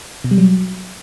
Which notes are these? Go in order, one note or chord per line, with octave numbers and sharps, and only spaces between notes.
B2
G3
F#3